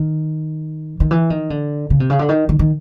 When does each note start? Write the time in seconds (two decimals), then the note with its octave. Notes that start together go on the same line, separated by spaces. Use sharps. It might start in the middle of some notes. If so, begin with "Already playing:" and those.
Already playing: D#3
1.00 D#3
1.11 E3
1.30 D#3
1.50 D3
1.90 C#3
2.00 C3
2.10 C#3
2.19 D3
2.29 D#3
2.49 D#3
2.59 D#3